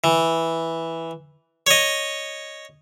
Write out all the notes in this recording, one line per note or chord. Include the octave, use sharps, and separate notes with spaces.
E3
C#5 D#5